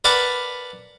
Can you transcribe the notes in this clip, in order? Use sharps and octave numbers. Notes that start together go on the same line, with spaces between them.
A#4 B4 D5 F#5 A5 B5